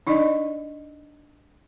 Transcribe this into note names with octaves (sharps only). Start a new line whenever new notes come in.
D4 D#4 D5 D#5